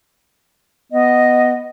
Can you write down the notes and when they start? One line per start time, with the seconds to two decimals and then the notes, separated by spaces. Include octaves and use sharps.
0.92 B3 D#5